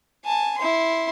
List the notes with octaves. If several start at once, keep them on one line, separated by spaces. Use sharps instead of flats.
G#5 A5
E4 C6